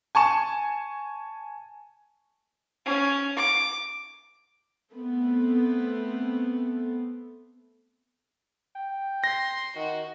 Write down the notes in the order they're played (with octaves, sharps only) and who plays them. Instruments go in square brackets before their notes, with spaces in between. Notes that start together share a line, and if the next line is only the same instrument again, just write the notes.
[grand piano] G#5 A5 C#6 E7
[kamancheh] C#4
D6
[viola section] A3 B3 C4 A4
[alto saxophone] G5
[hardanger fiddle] C6 [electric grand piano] A#6
[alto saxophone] D#3 [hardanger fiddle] F#4